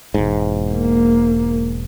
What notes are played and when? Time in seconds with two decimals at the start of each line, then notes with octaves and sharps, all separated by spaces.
0.14 E1 G#2
0.73 A#3